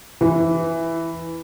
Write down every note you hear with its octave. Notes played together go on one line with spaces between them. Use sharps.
E3